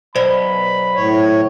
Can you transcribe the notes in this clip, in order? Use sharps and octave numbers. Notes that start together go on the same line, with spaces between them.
B1 C5 D5 B5
A2 C#5